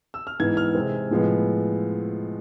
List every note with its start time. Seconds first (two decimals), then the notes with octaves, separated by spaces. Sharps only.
0.14 E6
0.27 F6
0.40 G#2 E3 B3 G#6
0.57 F6
0.75 C3 G#3 C4
1.11 A2 F3 G#3 B3